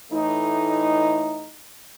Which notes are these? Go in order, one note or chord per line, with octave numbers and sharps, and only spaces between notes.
A2 E3 A3 D#4